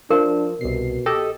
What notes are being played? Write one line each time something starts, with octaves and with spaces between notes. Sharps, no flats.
F3 D4 A#4
C2 B2 C7
G4 A4 D#5